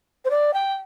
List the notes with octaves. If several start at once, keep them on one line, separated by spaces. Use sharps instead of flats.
C5
D5
G5